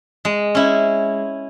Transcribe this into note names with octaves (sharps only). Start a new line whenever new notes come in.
G#3
C#4 E4